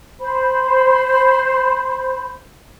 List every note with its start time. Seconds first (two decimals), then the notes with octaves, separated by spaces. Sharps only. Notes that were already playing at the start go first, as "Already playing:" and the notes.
0.20 C5 B5